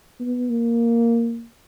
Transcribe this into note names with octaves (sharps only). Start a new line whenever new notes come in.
B3
A#3